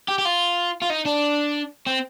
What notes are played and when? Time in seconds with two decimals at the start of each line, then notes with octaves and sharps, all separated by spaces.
0.08 G4
0.19 G4
0.25 F4
0.82 F4
0.90 D#4
1.05 D4
1.86 C4